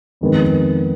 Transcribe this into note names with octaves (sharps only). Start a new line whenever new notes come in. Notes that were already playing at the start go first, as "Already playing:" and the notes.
F2 D#3 G#3 B3